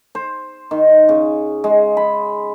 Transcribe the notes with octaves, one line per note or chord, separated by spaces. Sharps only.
C5
D#3
C#3
G#3
B5